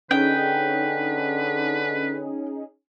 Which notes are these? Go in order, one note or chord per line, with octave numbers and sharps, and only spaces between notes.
D3 C#4 D#4 G#4 B4 G5